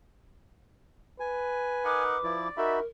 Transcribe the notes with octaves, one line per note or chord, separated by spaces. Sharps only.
B4 G#5
D#4 A#4 F#5 D6
F3 E4 D5
D#4 F#4 A#4 E5 B5